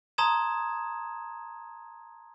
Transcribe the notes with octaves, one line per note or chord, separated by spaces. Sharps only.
A5 A#5 C6 D#6 G#6 E7